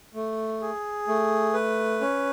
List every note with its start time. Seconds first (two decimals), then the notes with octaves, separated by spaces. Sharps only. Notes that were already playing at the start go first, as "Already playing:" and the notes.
0.14 A3
0.62 G#4
1.08 A3
1.54 B4
2.01 C#4